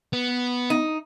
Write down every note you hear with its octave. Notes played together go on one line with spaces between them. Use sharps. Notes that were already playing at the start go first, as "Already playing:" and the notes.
B3
D#4